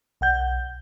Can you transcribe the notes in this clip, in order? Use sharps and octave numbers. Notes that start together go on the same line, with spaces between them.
B1 F#5 G6